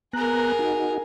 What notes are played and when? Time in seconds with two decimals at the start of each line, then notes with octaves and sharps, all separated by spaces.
0.13 B3 G#4 A#4 A#5 F#6
0.59 D#4 F#4